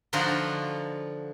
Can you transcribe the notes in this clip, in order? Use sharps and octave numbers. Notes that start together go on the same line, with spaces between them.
D3 F3 D#4 F4 F#4